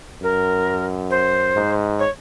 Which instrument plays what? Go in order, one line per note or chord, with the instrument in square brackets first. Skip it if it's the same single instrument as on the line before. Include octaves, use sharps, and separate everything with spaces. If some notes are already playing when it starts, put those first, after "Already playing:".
[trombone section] F#2 [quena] A#4
[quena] C5
[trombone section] G#2
[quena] C#5